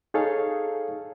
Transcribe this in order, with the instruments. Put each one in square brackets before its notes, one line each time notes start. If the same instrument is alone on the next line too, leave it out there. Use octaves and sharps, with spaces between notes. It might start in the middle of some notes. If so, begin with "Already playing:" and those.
[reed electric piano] D#4 G#4 A4 C#5 F5